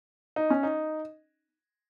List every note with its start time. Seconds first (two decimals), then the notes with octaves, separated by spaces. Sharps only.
0.36 D#4
0.50 C#4
0.63 D#4